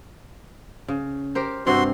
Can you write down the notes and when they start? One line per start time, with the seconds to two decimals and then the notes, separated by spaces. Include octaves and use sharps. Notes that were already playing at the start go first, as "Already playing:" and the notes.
0.88 C#3
1.35 G4 A#4 C5
1.66 G2 C3 C4 F#4 C6